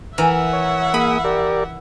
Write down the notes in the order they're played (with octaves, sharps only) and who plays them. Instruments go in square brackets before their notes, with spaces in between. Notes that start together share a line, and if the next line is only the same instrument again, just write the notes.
[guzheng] E3 A#4 [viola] E5 F#5
[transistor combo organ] C#5
[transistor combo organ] A#3 G#4 D#6 [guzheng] B5
[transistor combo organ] G4 A#4 D5